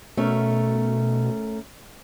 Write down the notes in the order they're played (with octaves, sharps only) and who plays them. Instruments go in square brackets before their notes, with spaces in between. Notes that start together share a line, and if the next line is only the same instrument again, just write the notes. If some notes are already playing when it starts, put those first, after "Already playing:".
[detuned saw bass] B2 [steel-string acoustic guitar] A3 C#4 A#4